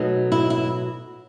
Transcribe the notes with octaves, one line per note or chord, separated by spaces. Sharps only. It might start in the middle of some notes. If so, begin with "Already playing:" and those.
Already playing: B2 F#3 A3 D#4
E4
E4